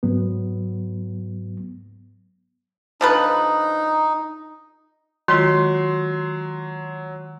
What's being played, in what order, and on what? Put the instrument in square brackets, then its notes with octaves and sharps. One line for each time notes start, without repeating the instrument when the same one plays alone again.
[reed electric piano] G#2 F#3 B3
[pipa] D3 F3 B4 [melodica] D#4
[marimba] D#3 G#3 F4 [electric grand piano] F#3 C6 C7